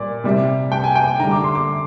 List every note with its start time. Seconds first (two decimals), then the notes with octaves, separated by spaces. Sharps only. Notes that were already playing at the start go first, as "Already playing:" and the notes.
Already playing: A#2 G3 D5
0.24 C3 G3
0.72 G5
0.84 G#5
0.95 G5
1.19 D3 A#5
1.24 G3
1.31 D6
1.44 C6
1.55 D6